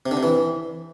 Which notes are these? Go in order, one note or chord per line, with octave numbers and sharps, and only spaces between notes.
C3
D3
C3
E3